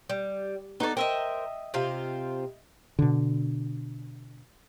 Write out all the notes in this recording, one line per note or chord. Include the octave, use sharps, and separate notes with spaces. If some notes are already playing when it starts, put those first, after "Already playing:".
G3
B3 D#4 A4 D5
A#4 C5 D#5 E5 G5
C3 C4 F4
B2 D3